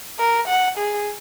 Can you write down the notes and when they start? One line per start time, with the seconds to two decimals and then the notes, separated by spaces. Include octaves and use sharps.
0.19 A#4
0.48 F#5
0.78 G#4